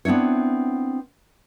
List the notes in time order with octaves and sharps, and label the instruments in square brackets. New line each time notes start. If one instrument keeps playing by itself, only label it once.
[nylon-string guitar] B3 C4 D4 E4 C#5